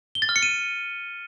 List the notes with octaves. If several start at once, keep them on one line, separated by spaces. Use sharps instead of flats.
G7
A6
F6
C#7
D#7